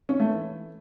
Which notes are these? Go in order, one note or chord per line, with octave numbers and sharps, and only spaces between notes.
C#4
A3
E3